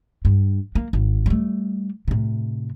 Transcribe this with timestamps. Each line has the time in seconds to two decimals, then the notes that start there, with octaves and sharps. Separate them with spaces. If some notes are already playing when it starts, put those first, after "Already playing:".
0.25 G2
0.75 A#3
0.93 G#1
1.26 G3 A3
2.08 A2 C3